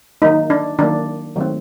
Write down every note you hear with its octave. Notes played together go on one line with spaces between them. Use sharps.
D#3 F#3 A#3 D#4
D4
D#3 F#3 A#3 D4
D#3 F#3 A3 C4